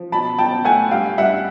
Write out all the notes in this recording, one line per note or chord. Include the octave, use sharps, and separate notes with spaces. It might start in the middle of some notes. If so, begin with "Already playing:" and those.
Already playing: F3
B2 A5 B5
B2 G5 A5
A3 F#5 G#5
G2 F5 G5
G2 E5 F#5